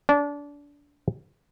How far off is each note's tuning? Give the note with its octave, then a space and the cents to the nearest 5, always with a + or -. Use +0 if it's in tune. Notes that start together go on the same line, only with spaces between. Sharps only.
D4 -25